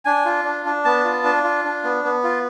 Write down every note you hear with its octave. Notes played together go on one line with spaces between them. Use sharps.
D4 G#5
F4
D4
D4
B3 A5
F4
D4
F4
D4
B3
B3
F4